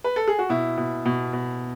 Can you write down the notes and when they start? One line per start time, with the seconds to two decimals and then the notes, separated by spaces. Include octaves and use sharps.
0.04 B4
0.16 A4
0.27 G#4
0.39 F#4
0.49 B2 E4
0.77 B2
1.06 B2
1.33 B2